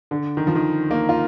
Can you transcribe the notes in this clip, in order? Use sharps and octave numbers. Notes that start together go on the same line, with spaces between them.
D3
D#3
F3
D#3
A#3
F4